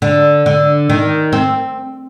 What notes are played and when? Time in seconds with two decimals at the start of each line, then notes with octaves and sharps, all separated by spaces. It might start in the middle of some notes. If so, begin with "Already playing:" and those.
0.02 D3
0.46 D3
0.90 D#3
1.33 C4